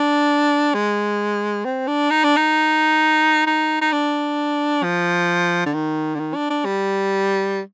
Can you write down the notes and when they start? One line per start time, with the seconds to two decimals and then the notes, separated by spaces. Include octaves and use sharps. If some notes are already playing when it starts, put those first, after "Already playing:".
Already playing: D4
0.74 G#3
1.65 C4
1.88 D4
2.11 D#4
2.24 D4
2.36 D#4
3.47 D#4
3.81 D#4
3.92 D4
4.83 F3
5.66 D3
5.74 D#3
6.15 D3
6.20 D#3
6.35 D4
6.50 D4
6.65 G3